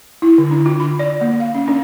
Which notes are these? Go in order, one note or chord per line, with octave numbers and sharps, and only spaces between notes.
E4
D3
D4
F4
B5
D5
A#3
F5
C#4
D4